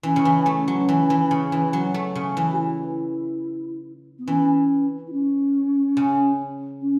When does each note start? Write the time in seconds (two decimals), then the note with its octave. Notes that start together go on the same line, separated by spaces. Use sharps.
0.03 E3 C#4
0.16 C#3
0.25 E3
0.46 A3
0.68 F#3
0.89 E3
1.10 E3
1.31 C#3
1.52 E3
1.73 F#3
1.94 A3
2.15 C#3
2.37 E3
2.52 F#4
2.58 E4
4.18 B3
4.27 E3 C#4
5.07 E4
5.12 C#4
5.97 C#3
6.81 C#4